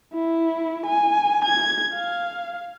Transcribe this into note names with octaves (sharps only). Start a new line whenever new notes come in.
E4
G#5
G#6
F5